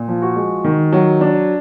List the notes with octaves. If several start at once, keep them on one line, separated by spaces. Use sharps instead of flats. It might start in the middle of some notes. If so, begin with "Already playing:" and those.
Already playing: A#2
F3
F#4
G#3
D#3
F#3
D4